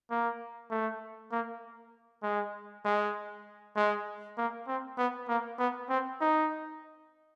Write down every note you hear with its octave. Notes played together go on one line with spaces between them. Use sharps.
A#3
A3
A#3
G#3
G#3
G#3
A#3
C4
B3
A#3
B3
C4
D#4